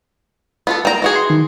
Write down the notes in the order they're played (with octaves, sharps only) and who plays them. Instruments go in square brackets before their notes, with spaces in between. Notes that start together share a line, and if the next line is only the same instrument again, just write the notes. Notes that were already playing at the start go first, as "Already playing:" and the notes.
[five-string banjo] B3 F4 A4
[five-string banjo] A#3 A#5 [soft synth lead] G5
[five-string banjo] E3 F#4 G#4
[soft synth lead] C6
D#3